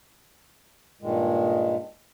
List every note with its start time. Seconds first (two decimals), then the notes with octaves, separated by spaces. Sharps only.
1.01 G2 A#2 D#3 G#3